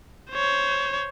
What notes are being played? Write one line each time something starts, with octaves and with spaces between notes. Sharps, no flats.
C5 C#5